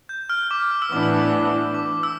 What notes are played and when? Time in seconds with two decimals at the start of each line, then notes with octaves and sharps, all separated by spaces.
0.09 G6
0.29 F6
0.51 D6
0.71 F6
0.82 E6
0.92 A2 E3 B3 D4 D6
1.03 E6
1.74 D6
2.03 E6